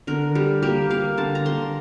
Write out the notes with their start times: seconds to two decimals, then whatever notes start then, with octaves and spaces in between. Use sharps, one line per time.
0.07 D3 A#4
0.35 G3
0.63 A#3 G4
0.90 A#3 F5
1.17 D3 A5
1.35 A#5
1.46 A#3 C6